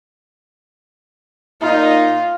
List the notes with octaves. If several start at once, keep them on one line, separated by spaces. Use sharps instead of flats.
A#2 D#4 F4